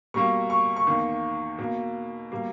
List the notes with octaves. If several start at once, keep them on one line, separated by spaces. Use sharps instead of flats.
B2 G3 A#3 C#6
C#6
C#6
E2 D#3 A#3
B2 A#3
B2 G3 A#3